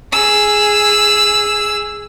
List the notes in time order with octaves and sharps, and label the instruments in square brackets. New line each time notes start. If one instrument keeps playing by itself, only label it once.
[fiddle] G#4 E6